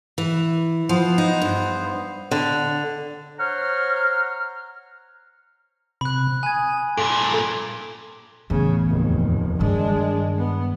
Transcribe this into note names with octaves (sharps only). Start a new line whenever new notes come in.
E3
F3 B3 C5
D#4
G2
D3
C5 C#5 F#5 A#5 F6
C3 B5 F#6
G#5 D#6 G#6
G2 A#2 A4 D7
E2 A2 C#3
F1 D#2
G2 D#3 G#3 D4
B3